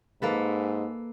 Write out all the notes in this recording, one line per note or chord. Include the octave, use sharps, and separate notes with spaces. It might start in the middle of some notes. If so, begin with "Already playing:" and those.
G#2 A#3 A4 B4